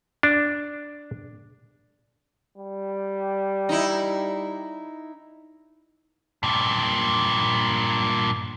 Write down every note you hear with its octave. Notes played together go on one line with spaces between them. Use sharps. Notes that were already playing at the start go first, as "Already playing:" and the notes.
D4
G3
D#4 E4
G2 A#2